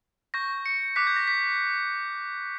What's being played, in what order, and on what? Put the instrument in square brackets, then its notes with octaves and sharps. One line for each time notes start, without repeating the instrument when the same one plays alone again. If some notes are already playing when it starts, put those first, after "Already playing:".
[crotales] C#6 G6 A#6
C#7
D6 F#6 B6
G6
A#6
B6